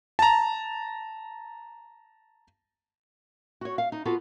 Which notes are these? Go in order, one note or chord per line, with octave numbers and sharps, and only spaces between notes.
A5 A#5
F#4 C#5
F5
D#4
B3 F4 F#4 A4